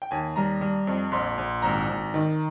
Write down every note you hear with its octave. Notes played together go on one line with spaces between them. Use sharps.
G5
D#2 G#5
G3 A#5
G3
F2
A#1 C6
A#1
G#1 A#5
G#1
D#3